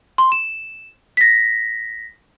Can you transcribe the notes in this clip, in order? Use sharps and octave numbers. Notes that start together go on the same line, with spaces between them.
C6
E7
A#6 B6